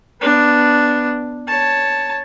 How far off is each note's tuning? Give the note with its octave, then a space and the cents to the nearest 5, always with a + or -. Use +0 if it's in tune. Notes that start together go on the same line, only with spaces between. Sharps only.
B3 +0 D4 +0
C#5 +0 A5 +0